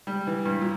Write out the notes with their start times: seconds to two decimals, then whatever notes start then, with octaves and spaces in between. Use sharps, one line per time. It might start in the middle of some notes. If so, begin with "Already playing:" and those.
0.07 G3
0.27 E3
0.45 G2
0.61 A#2